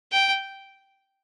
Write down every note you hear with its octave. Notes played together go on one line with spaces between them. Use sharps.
G5